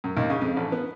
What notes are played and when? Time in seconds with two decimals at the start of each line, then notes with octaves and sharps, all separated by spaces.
0.04 F#2
0.17 D#2
0.30 C#3
0.42 F2
0.57 A1
0.72 B3